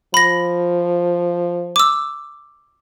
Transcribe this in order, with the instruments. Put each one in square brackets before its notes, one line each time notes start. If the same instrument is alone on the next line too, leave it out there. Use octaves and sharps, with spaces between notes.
[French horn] F3 [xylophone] B5 A#6
[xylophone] D6 E6